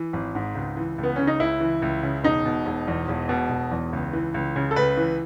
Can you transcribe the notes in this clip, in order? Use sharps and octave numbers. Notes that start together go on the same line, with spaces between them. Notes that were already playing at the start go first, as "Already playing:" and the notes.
Already playing: E3
G#1
G#2
C#2
E3
C#2
B3
C#3 C#4
D#4
C#2 E4
E3
C#2
C#3
E1 D#4
B2
E1
E2
E1
B2
E1
E2
C#2
E3
C#2
C#3
A4
C#2 B4
E3